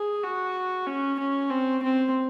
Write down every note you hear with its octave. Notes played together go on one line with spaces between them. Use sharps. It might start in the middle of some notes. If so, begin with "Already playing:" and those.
Already playing: G#4
F#4
C#4
C#4
C4
C4